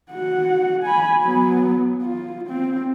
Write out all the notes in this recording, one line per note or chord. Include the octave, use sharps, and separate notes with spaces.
F#4 F#5
G#5 B5
F#3 B3
F4
C4